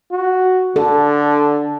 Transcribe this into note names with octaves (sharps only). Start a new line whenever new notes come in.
F#4
D3 A4